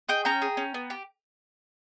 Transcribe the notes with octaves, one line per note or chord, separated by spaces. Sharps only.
G#4 D#5 G5
C#4 G5 A#5
G#4
C#4
B3
G4